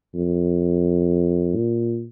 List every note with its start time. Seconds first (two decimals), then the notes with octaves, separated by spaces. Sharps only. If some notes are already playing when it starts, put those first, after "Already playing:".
0.15 F2
1.55 A#2